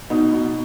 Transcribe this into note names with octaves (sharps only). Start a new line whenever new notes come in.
B2 D#4
B2